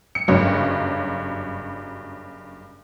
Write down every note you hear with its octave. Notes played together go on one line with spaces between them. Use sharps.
C#7
F#1 G2 F#3